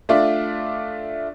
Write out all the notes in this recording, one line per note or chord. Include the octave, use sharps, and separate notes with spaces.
A3 D4 F4 D5 E5